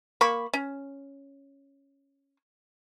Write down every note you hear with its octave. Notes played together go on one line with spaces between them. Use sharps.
A#3 B5 C#6
C#4